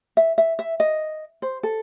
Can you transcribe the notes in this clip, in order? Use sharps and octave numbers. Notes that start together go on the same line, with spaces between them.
E5
E5
E5
D#5
C5
A4